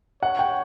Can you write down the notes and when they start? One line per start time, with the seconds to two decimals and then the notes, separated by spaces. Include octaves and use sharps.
0.23 C#5 F#5
0.39 G5